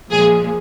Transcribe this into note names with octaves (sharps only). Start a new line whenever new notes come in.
A#2 F3 G#3 G#4